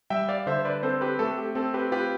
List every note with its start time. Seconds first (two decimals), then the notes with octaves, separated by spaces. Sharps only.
0.10 G3 E5 G5
0.29 D5 F5
0.47 D3 C5 E5
0.59 C5
0.65 B4 D5
0.83 C4 A4 C5
1.01 G4 B4
1.19 A3 A4
1.38 G4
1.55 C4 A4
1.74 G4 B4
1.92 F4 G4 B4